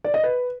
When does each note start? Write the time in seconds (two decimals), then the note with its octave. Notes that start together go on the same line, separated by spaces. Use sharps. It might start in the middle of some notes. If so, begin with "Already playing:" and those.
0.04 D5
0.14 D#5
0.23 B4